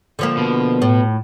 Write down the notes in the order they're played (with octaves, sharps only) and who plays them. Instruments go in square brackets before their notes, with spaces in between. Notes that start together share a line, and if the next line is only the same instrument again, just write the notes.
[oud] D3 F3 A#3
[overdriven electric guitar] B2
[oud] A2